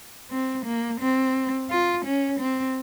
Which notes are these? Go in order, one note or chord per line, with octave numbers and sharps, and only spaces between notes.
C4
A#3
C4
F4
C#4
C4